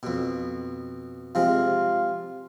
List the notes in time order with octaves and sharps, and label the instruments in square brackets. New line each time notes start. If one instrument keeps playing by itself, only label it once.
[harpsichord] F2 B2
[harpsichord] C3 F3 G#3 [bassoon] F4